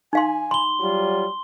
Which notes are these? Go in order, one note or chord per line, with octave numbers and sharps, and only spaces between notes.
D#4 F5 G#5 C6
B5 C6 G7
F#3 G3 F4